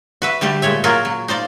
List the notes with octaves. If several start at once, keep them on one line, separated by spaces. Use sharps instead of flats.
F#4 B4 E5
D3 G3 A3 G4
A#2 G#3 C#5 E5
F#3 A#3 F4 F#4 G#4 A#4
F#3
D#4 C5 D5 F5